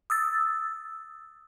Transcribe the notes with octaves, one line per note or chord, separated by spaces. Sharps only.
D#6 E6 A6